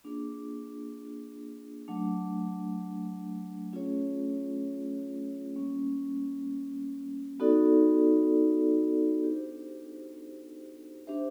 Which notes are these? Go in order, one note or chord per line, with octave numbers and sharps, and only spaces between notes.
A#3 D4 F4 G#4
F#3 A3 D4
A3 C#4 F4 G#4 C#5
G3 A#3 C#4
B3 D#4 F#4 A4 D5
D4 G4 C5
D4 G4 C5 E5